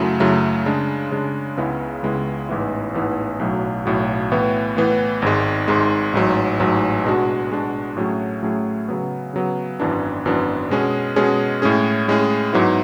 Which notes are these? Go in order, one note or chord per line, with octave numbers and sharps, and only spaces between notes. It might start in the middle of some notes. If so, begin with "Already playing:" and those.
Already playing: F#2 C#3 F#3 A3 E4
F#2 C#3 F#3 A3 E4
C#3 G#3 D4
C#3 G#3 D4
C#2 C#3 G#3 B3 E4
C#2 C#3 G#3 B3 E4
A1 G#2 E3 B3 E4
A1 G#2 E3 B3 E4
B1 A2 F#3
B1 A2 F#3
A2 E3 B3
A2 E3 B3
G#1 G#2 G#3
G#1 G#2 G#3
A1 G#2 F#3
A1 G#2 F#3
B2 G#3 D4 F#4
B2 G#3 D4 F#4
A2 F#3 A3 C#4 G#4
A2 F#3 A3 C#4 G#4
C#3 F#3 B3
C#3 F#3 B3
G#1 F#2 E3 B3 D4
G#1 F#2 E3 B3 D4
B2 G#3 C#4 G#4
B2 G#3 C#4 G#4
A2 G#3 C#4 G#4
A2 G#3 C#4 G#4
G#2 F#3 B3 E4